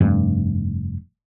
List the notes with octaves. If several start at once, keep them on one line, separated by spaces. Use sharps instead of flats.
F1 G2